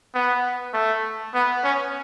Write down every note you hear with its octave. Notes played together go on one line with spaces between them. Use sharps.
B3
A3
B3
C#4